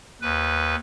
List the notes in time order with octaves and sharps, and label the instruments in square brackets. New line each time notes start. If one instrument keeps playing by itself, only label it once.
[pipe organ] D#2 B4